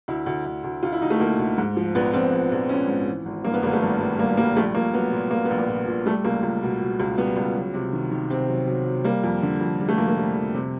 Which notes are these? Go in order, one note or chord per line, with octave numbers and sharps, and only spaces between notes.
D2 E4
D2
D2
D2
D2 F4
E4
D2 D#4
A3
D2 A#3
D2
G#2
F3
A#1 B3
A#1 C4
A#1
A#1
A#1 C#4
G#2
E3
G#1
G2 A#3
B3
G#1 A#3
A3
G2
G3
G3 A#3
G3 A#3
A#1 A3
A#1 A#3
F#3 B3
A#2
A#2 A#3
B3
A#1
A#3
A#2
A#2
G3 A3
C#2 A#3
C#2
B2
B2
C#2
G3 B3
C#2
F#3
C3
D#3
D#3
C3 C4
F#3
F#3
F#3
G3 A#3
F2
D3
F2
G3
A3
F2 A#3
A#3
G3
F2
C3